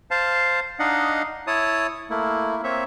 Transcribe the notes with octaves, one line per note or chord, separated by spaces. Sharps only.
C5 F5 A5
D4 D#4 D#5 F5 F#5
E4 C#5 A5 D#6
A3 A#3 E4
A#3 C4 C#5 E5